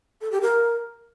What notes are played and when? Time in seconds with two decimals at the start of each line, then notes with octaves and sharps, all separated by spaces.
0.21 A4
0.31 G4
0.42 A#4